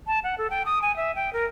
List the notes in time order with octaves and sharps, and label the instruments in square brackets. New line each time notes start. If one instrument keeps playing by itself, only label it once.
[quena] A5
F#5
A4
G5
D#6
G#5
E5
G5
A#4